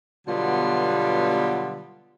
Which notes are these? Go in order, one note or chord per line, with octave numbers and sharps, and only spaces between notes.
B2 D3 F#3 G3 B3 F4